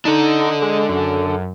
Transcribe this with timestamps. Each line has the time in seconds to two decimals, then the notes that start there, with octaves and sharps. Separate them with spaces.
0.05 D4 D#4 A4
0.62 G#3
0.89 F#2